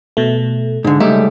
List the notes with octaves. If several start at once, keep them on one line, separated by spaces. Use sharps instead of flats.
B2 A3
G#2 D3
C#2 G3 A3 D#4